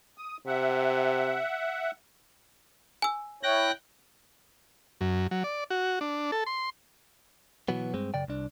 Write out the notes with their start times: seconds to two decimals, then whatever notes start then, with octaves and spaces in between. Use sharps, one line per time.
0.18 D#6
0.47 C3 E5 F#5
3.02 G#5 E6
3.43 E4 C#5 G5 F#6 A#6
5.01 F#2
5.31 F#3
5.44 D5
5.70 F#4
6.01 D4
6.32 A4
6.46 C6
7.68 B2 E3 F#3 B3
7.94 G2 G#3 C4
8.14 F#2 C#3 D5 G5
8.28 C2 D4